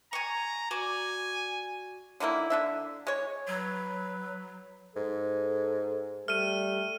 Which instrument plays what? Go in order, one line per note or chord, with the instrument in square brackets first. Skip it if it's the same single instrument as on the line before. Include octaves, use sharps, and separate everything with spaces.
[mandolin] G#5 C#6 [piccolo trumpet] A#5
[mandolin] F#4 D5 [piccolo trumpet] G#5
[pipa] D3 D#3 A#3 E4
D3 D4 E5
G#3 C#5
[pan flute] F#3 [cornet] B4
[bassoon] G#2 [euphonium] A4
[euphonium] G3 [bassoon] A3 [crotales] F6 D#7